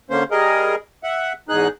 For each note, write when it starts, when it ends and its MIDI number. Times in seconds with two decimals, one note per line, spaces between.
0.10 0.24 50
0.10 0.24 58
0.10 0.24 61
0.10 0.24 72
0.31 0.75 55
0.31 0.75 68
0.31 0.75 70
0.31 0.75 75
1.04 1.33 76
1.04 1.33 78
1.49 1.68 40
1.49 1.68 44
1.49 1.68 63
1.49 1.68 68
1.49 1.68 90